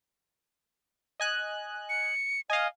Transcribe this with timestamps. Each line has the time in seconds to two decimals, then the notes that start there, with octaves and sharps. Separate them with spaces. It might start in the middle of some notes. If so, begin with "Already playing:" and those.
1.20 D#5 G#5 F#6
1.89 C#7
2.50 D#5 F5 G#5